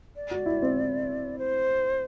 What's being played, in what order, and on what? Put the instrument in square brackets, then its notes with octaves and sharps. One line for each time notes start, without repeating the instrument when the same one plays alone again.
[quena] D5
[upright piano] F#4
E4
C4
[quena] C5